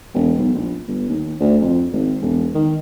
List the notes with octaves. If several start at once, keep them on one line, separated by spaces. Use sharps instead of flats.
E1
B1
A#1
G1
D#2
D2
F2
G#1
E1
D#3